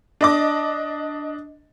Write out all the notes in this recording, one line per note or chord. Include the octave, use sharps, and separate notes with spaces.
D4 D#5 D6